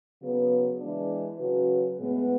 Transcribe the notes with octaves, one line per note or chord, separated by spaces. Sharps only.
C#3 F#3 B3
E3 G#3 D4
C#3 F#3 C#4 F#4 B4
A2 G#3 B3